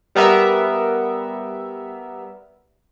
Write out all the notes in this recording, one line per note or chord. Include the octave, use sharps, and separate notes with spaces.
G3 B3 A#4 E5